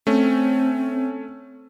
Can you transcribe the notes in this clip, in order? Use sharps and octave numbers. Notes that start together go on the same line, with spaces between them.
A3 C4 C#4